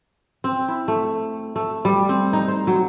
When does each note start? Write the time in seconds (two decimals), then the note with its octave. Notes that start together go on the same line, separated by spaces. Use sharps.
0.44 C4
0.68 E4
0.88 A3
1.56 A3
1.85 G3
2.09 C4
2.33 D#4
2.48 C5
2.67 F#3